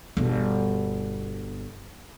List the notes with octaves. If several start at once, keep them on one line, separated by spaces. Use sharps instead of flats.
G1 B2